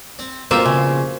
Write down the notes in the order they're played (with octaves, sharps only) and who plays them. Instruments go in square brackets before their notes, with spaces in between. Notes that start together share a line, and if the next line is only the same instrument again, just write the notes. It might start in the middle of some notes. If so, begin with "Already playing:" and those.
[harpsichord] C4
[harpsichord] A#1 B2 F4 [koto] A#3 E5 [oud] C4
[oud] C#3